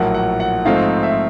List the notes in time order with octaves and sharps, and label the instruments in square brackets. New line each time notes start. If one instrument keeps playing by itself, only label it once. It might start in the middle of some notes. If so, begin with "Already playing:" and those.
Already playing: [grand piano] A#1 A2 F#3 A#3 F#5
F#5
F#5
G#2 F3 A3 C4 D#4 F5
E5